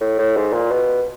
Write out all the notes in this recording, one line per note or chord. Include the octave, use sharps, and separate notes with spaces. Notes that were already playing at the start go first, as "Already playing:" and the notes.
A2
A2
G#2
A#2
B2